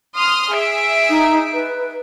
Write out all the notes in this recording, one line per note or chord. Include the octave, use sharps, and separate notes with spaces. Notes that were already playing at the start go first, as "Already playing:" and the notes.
C6 D#6 F6
G#4 E5 D7
D#4
B4